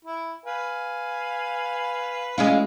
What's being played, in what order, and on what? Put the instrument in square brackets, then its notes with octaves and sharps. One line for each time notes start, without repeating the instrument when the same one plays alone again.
[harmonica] E4
B4 F5 G#5
[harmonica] E3 [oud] G#3 C#4 F4